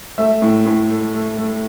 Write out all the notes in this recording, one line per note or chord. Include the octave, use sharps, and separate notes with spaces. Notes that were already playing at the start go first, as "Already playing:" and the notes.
A3 E5
A2
A2
A3
A3
A3